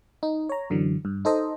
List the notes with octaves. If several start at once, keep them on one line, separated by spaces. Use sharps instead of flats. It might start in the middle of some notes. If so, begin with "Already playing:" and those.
D#4
C#5 A#5
F#2 D3 E3 F#3
G2
D#4 A4 C5 D#5